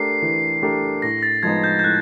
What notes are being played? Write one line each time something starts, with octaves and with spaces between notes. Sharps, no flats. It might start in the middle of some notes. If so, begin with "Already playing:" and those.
Already playing: A3 D4 G4 A#4 C7
E3
A3 D4 G4 A#4
A2 A#6
A6
F3 G#3 B3 D#4 G#6
G6
G6
A2 F#6